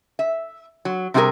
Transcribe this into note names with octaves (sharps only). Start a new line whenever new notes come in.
E5
F#3
C3 G3 D#4 F#4 G#4 A#4